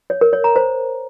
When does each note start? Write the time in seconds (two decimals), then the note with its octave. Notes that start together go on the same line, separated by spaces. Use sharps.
0.10 C#5
0.21 A#4
0.33 C#5
0.44 A#5
0.56 C5